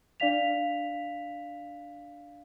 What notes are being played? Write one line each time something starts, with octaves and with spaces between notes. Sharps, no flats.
D4 D5 F5 B6 F7